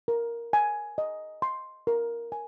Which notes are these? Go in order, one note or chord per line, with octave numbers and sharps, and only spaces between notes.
A#4
G#5
D#5
C6
A#4
G#5